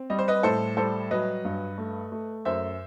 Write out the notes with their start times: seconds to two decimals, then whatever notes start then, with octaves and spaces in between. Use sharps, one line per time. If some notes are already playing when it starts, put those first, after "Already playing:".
Already playing: C4
0.10 G3 D#5
0.19 C5
0.28 B4 D#5
0.43 A2 A4 C5
0.77 G3 A4 C5
1.11 F#3 B4 D#5
1.45 G2
1.78 A3
2.12 A3
2.45 F#2 C5 E5